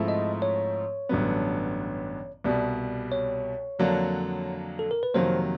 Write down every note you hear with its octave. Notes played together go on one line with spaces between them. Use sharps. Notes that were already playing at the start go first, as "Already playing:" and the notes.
Already playing: G#2 F3 A3 C4 E4
D#5
C#5
A1 G2 D3 F#3 B3
C2 B2 G3
C#5
F2 D3 F#3 A#3 D4
A4
A#4
B4
F2 C3 D#3 F#3 A#3 C5